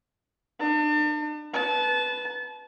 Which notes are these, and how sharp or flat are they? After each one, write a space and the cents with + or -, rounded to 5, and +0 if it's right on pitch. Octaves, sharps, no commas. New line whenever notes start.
D4 +40 A5 +40
B4 +0 A5 -25